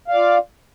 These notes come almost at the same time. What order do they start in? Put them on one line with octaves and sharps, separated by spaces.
F5 D5 F4